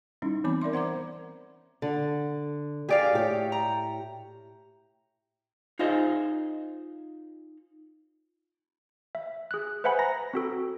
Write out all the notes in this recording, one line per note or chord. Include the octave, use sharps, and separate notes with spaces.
G3 C#4 D#4 E4
E3 B3 C4 B5 D6
A#4 D5 E5 C6
C5 F#5 A#5 D6
D3
G4 G#4 D5 F5
A2 G4 C#5
A#5
D#4 F4 G#4 C5 D#5
E5
G#4 F#6
B4 C5 E5 F#5 G#5 B5
A#5 A#6
C4 F#4 A4